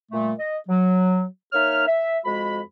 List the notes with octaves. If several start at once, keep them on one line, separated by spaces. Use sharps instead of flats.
A#2 G3 A3
D#5
F#3
A#3 D#4 C#5 E5 F6
E5
F2 G#3 F#4 B5